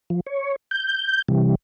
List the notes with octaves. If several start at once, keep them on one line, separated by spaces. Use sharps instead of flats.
F3
C#5
G6
C3 E3 G3